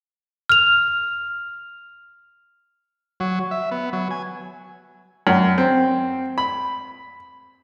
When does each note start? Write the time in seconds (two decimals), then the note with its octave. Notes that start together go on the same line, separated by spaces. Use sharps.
0.49 F6 F7
3.20 F#3
3.51 E5
3.71 B3
3.93 F#3
4.11 G#5
5.27 F#2
5.58 C4
6.38 B5